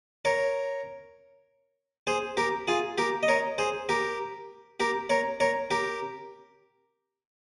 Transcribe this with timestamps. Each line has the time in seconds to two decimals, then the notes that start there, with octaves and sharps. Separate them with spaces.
0.25 A#4 C#5
2.07 G#4 C5
2.37 G4 A#4
2.68 F4 G#4
2.98 G4 A#4
3.23 D#5
3.28 A#4 C#5
3.58 G#4 C5
3.89 G4 A#4
4.80 G4 A#4
5.10 A#4 C#5
5.40 A#4 C#5
5.71 G4 A#4